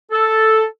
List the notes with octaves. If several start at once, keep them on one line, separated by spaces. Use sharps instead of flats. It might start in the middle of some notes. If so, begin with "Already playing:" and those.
A4